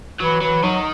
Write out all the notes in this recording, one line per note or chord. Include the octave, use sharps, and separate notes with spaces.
E3 F#3
E3 F#3
D#3 F#3